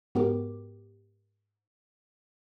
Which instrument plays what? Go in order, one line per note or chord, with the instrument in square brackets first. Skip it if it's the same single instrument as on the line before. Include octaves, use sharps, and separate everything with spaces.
[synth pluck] G#2 B3 F#4 G4 A#4 D6